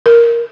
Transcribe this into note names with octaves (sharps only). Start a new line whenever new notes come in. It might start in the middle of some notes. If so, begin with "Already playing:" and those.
A#4